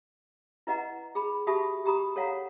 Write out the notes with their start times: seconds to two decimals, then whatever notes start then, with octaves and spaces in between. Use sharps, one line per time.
0.67 E4 B4 D#5 F#5 A#5
1.15 G#4 B5
1.47 F#4 G4 E5 A5 B5 D#6
1.85 G4 A#5 B5 D#6
2.16 A4 C#5 F5 F#5 A#5